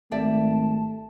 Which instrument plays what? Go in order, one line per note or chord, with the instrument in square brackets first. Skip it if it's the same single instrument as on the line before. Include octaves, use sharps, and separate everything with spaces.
[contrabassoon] G#1 [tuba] A3 [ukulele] G4 D5 E5 [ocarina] A5